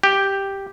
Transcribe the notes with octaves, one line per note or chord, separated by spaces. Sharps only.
G4